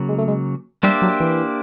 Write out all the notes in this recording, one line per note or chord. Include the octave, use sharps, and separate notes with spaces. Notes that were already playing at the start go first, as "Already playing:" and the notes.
Already playing: C#3 F#3 A#3
G#3
A3
G#3
G3 A#3 D4 G4 C5 E5
F#3
E3